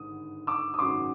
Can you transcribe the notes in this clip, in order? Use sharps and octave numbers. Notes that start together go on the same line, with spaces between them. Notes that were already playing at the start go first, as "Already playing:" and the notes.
Already playing: G#1 G2 D3 D#6
D6 E6
D#6
G#1 F#2 C#3 F#3 C6 D6